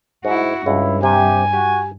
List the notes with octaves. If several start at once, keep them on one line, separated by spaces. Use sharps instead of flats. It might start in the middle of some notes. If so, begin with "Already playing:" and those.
G#2 E4 F#4
C#2 G2 E4
C3 G4 G#5
F#4 G4